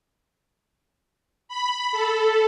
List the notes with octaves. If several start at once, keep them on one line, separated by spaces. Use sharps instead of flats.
B5
A4